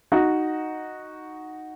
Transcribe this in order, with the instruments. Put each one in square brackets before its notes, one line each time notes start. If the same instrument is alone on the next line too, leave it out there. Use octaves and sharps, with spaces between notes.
[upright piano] D#4 F#4